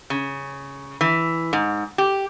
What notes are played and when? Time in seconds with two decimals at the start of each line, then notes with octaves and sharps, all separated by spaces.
0.10 C#3
1.01 E3
1.53 G#2
1.98 G4